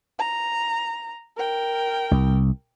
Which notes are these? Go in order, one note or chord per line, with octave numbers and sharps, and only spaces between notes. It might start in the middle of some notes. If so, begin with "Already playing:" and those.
A#5
A#4 G5
C2